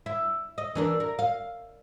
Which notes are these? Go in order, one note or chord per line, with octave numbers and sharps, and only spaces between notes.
E4
D#5
E3 D4 A#4
A#4
F5